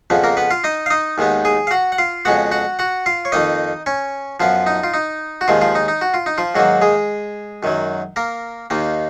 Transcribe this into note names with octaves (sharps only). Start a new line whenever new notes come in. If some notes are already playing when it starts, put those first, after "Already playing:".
F2 C#3 F3 B3
A#3 A#4
B3 B4
F4 F5
D#4 D#5
F5
D#4 D#5
D#2 D#3 G#3 B3
G#4 G#5
F5
F#4 F#5
F#5
F4 F5
F2 C#3 G#3 B3 F#4 F#5
F#4 F#5
F#4 F#5
F4 F5
C#5
F2 D#3 A#3 D#4 D#5
C#4 C#5
F#2 F3 B3 F4
D#4
F4
D#4
F#4
D#2 D#3 F3 G#3 F4
F3 F4
D#4
D#4
F#4
F4
D#4
F3 F4
G#2 D#3 F#3 A#3 F#4
G#3 G#4
F#2 D#3 F#3
A#3 A#4
D#2 D#3 A#3